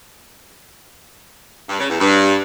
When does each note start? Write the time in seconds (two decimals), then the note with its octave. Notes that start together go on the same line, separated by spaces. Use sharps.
1.69 G2
1.80 C#3
1.90 E2
2.00 G2